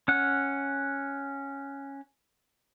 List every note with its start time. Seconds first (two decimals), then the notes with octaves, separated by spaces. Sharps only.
0.08 C#4 F#5